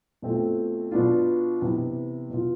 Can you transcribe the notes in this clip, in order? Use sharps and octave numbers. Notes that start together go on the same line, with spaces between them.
B2 A3 C4 F4
B2 B3 D4 F4
C3 E3 B3
B2 B3 F4